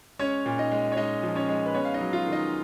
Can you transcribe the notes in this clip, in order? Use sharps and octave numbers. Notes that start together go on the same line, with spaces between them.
G#3 C#4 C#5
A#2
D#4 D#5
G#3
C#5
G#3 D#4 D#5
F3
C#4 C#5
G#3
B4
B3 C#4 C#5
F5
D#4 D#5
F#3
F4 F5
D#3
D#4 D#5